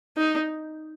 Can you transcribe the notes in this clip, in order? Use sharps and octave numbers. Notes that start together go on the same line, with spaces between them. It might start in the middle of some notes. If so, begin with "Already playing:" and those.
D#4